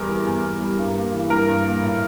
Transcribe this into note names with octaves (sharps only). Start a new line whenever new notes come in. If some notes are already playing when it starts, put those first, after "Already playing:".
Already playing: E2 G3 A#4
E3
E2
E2
G3
G2
A#3
E3
G2 A#4
G2
A#3
A2